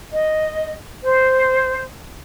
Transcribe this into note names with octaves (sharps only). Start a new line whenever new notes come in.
D#5
C5